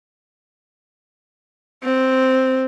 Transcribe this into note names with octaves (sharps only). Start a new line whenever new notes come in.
C4